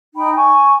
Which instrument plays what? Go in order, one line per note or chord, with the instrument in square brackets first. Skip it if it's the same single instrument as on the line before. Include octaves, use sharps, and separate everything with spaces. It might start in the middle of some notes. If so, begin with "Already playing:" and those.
[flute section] D#4 G5 B5
G#5 C#6